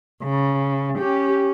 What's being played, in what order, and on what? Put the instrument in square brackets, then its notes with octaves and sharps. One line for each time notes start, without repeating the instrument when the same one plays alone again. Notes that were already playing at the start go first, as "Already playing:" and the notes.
[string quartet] C#3
[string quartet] C#4 [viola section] G4